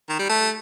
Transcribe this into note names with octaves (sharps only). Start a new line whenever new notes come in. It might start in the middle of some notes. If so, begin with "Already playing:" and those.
D#3
G3
A3